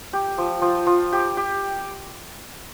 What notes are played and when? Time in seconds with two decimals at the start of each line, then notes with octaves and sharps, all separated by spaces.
0.13 G4
0.38 F3
0.62 F3
0.86 F3
1.12 G4
1.37 G4